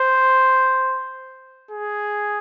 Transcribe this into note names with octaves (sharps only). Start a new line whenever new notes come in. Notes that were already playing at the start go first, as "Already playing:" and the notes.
Already playing: C5
G#4